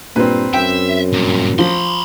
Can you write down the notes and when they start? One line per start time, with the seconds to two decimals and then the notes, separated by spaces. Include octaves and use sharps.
0.16 G2 A#2 C4 B4
0.54 F#2 E5 G5
1.13 G2 A#2
1.59 F3 B5 C6